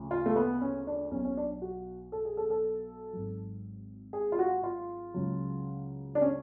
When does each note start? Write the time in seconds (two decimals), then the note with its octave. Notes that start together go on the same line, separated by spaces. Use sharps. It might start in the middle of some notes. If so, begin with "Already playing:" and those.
Already playing: D2 C#3 F3
0.11 F4
0.26 A3
0.36 B3
0.61 C#4
0.87 D4
1.11 B1 B2 F#3 C#4
1.24 C#4
1.37 D4
1.62 F#4
2.12 A4
2.25 G#4
2.37 A4
2.50 A4
3.13 G#1 G#2 F#3
4.13 G#4
4.32 F4
4.39 F#4
4.63 F4
5.14 C#2 C#3 F#3
6.15 D4
6.21 C#4